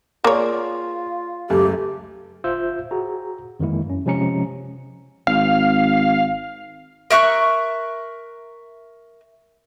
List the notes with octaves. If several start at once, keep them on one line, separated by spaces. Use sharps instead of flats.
A#3 F4 G#4 A#4 C#5 D5
C#2 F#2 A3 G4
G1 F4 C5 E5 E6 G6
F#4 G#4 A#5
F2 D#3 E3 G#3 A#3 E4
F#2 C#4
C3 F3 G#3 C#4 A#5 C#7
G#1 F5
A#4 E5 C#6 F#6